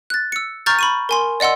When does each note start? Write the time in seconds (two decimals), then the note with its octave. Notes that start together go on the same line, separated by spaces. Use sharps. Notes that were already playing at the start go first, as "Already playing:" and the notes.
0.10 F#6 A6
0.32 E6 C#7
0.66 A#5 C#6 F6 G6 A6
0.79 B5 C#6 D#7
1.09 A#4 G#5 C6
1.40 D5 D#5 F#5 C6 E6